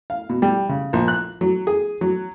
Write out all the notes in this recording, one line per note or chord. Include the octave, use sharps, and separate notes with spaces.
F5
B2
G3
C#3
A#1
F#6
F#3
G#4
F#3